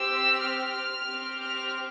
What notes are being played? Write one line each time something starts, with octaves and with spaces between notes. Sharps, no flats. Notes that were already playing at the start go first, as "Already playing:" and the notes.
Already playing: C4 G4 E6
F6
C4 G4
F6